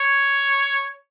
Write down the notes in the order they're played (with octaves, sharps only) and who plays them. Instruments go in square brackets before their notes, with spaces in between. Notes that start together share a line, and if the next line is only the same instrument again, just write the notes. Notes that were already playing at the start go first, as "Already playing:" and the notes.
Already playing: [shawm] C#5